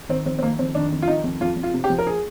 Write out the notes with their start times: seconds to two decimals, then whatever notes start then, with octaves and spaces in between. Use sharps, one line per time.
0.09 D#3 C4
0.26 F2 C4
0.39 C4
0.42 D#3 A#3
0.59 F2 C4
0.75 D#3 D4
0.92 F2
1.02 F4
1.08 D#3 D#4
1.24 F2
1.41 F2 F4
1.57 F2
1.63 F4
1.74 C3
1.84 G4
1.90 F3
1.98 A#4
2.07 G#4